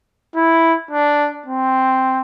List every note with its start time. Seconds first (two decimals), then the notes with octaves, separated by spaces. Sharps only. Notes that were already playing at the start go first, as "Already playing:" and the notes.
0.35 E4
0.91 D4
1.46 C4